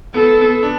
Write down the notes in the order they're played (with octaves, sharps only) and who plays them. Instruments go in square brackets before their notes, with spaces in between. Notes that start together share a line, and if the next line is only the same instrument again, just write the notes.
[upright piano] B3 [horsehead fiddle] A4
[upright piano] B3
D4